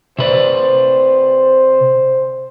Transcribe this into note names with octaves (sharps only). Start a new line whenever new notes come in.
C3 B4 C5 D5